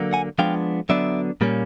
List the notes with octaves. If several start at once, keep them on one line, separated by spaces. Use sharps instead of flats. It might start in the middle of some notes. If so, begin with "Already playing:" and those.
Already playing: D3 F#3 A#3
F#5 G#5
F3 G#3 B3 D4 F5 G5
D3 F#3 B3 D4 D5 E5
A#2 G3 A#3 C#4